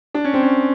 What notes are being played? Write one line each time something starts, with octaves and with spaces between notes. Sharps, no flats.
D4
C#4
C4
C#4